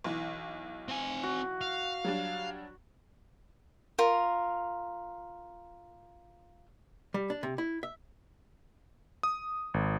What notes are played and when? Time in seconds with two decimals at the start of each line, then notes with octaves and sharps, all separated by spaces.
0.04 B1 E3
0.88 C4 G#5
1.23 F#4
1.61 F5
2.04 F#3 G3 D4
3.98 F4 A#4
7.14 G3
7.30 D4
7.43 C3
7.58 E4
7.83 E5
9.23 D#6
9.74 G#1